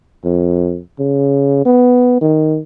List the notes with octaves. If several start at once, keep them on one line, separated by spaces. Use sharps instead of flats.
F2
C#3
B3
D#3